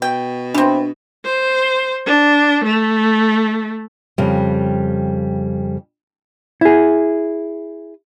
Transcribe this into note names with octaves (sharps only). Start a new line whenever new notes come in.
B2 G5
E3 C4 D4
C5
D4
A3
F2 C#3 G3
E4 G#4